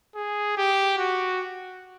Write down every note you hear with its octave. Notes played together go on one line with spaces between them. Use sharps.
G#4
G4
F#4